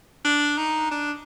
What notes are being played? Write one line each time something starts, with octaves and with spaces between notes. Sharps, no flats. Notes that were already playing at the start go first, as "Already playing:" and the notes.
D4
D#4
D4